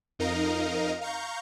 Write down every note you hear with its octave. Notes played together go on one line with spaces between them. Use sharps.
F2 D#4 A#4 D#5 F5 A#5
F5 A#5 C#6 G6